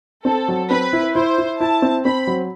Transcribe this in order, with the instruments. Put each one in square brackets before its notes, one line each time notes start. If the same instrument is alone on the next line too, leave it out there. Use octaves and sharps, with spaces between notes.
[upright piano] C4 [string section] A4
[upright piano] F#3
[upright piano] C4 [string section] B4
[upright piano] E4
[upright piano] E4 [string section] C5
[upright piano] E4
[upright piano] E4 [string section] A5
[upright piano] C4
[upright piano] C4 [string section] B5
[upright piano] F#3